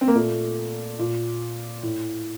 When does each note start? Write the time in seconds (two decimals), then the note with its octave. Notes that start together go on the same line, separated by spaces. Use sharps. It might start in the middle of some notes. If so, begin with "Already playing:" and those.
0.01 C4
0.08 A#3
0.15 A#2 A3
0.99 A#2
1.83 A2